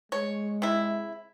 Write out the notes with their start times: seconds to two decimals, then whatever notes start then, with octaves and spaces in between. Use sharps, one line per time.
0.12 G#3 C#5
0.62 C3 E4